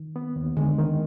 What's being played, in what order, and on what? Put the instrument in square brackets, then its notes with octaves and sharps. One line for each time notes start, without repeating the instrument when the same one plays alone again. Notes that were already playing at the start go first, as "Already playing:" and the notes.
Already playing: [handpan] D#3
[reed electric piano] B3
D#2
[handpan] D3 [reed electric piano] G#3
[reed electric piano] D#3